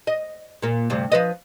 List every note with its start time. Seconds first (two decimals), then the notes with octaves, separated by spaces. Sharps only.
0.07 D#5
0.62 A#2 A#3
0.90 D2 G2 C3
1.12 F3 B4 D#5